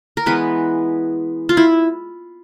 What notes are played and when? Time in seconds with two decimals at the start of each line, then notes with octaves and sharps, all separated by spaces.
0.17 A#4
0.26 E3 G#3 B3 B4
1.49 F4
1.57 E4